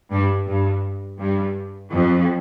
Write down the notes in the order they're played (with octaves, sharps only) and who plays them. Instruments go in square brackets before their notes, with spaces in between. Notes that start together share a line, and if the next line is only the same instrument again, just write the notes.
[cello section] G2
G2
G2
F2